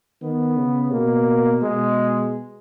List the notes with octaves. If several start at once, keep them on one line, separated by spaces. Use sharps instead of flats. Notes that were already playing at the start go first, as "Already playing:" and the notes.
D#3 B3
C#3
B2 A#3
B2 G#3